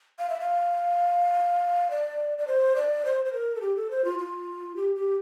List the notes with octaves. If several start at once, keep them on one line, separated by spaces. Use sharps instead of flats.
F5
E5
F5
D5
D5
C5
D5
C5
C5
A#4
A4
G4
A4
C5
F4
F4
G4
G4